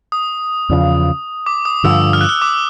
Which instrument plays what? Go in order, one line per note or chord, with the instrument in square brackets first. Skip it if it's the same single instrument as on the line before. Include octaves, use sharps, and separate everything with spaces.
[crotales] D#6
[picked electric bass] E2 C#3 F3
[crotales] D6
D#6
[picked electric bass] G2 D3 F3 [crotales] E6
[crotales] F6
F#6
F6
D6